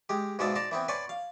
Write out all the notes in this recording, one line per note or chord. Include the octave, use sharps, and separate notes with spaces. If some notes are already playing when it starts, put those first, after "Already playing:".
G#3 G4
G#2 B2 G#3 F4 D5 E5
D5 A5 A#5 C6
E3 B3 C4
B4 C#5 D5 F#5 G#5 C6
F5